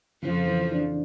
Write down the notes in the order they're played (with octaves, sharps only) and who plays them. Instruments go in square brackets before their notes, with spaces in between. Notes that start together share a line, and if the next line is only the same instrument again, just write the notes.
[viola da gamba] F2 F3 [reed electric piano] C#3
[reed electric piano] E3
D4